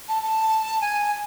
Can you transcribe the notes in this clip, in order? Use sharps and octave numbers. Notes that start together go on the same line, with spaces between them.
A5
A5
G#5